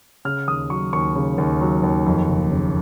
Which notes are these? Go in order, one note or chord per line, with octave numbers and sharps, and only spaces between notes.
C#3 F6
D#2 D#6
F#3 C#6
D#2 C#6
C#3
D#2
F#3
D#2
F2
F#1
C#3